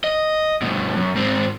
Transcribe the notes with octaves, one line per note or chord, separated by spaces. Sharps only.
D#5
G2 B2
F#2
G#2 C4